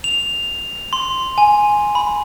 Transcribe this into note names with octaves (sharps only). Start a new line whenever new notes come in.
F7
C6
G#5
B5